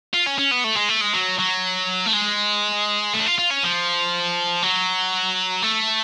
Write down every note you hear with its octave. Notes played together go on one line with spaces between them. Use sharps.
F4
C#4
C#4
B3
A3
G#3
A3
G#3
F#3
F#3
A3
G#3
A3
D4
F4
F4
C#4
F3
F#3
A3